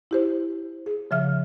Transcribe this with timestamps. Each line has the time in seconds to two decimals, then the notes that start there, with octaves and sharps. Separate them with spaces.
0.11 E4 G4 C5
0.86 G#4
1.11 C#3 F3 E5 F6